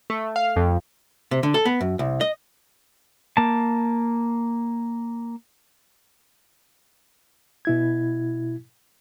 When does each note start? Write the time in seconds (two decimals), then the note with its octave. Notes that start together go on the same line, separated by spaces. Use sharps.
0.10 A3
0.36 F5
0.56 F2
1.31 C3
1.43 D3
1.54 A4
1.65 B3
1.81 F#2
1.99 C2
2.21 D#5
3.37 A#3 A5
7.65 B2 E4 G#6